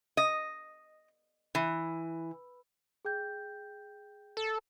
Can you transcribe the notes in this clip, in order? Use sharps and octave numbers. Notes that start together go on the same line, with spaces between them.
D#5
E3
G#4 G5 G6
A4